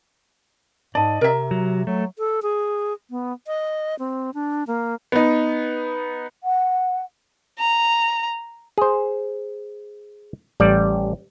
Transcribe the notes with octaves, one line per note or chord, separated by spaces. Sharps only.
G#2 D5 D#5 A5
C3 A#4 E5
F#3
F#3 A3
A4
G#4
B3
D#5
C4
D4
A#3
B3 D#4
F#5
A#5
G#4 C5
A1 G3 D5